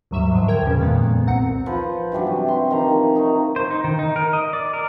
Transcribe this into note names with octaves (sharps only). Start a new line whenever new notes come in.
D#2 G#2 F#3 G3 E5 E7
G#2 D3 F3
A#4 G5 G#6
E2 A#2 C#3 F3 C#4
F2 A#2 D#3 G#3 B3
C2 C4 F#5 A#5 C#7
F3 B4
G2 E3 F#3 G3
C3
C6
D#3 F3 A#5
D#4 A#5 C#6
C5
D#4
D#3
D#4
A#4
D#5
D5
A#4